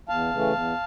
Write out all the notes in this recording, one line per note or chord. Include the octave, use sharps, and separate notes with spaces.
E2 F5 A5
C#3 E3 A3
E2